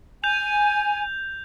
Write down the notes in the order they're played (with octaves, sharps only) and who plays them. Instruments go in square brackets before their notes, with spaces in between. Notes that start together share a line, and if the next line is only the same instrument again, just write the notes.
[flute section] G#5 [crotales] G6 F7